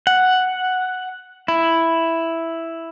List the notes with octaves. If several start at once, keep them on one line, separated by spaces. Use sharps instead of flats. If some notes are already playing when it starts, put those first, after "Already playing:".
F#5
E4